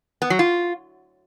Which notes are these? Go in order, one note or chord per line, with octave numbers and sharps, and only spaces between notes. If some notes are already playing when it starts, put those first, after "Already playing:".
B3
F#3
F4